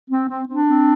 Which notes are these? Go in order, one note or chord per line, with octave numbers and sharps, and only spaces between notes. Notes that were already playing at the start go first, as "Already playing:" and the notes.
C4
C4
C4 D4
C4